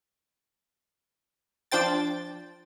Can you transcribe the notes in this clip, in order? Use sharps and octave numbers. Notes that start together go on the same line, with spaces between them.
F3 D4 C5 G5 A6